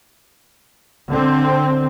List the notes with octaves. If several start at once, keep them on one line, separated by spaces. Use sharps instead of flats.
D3 C4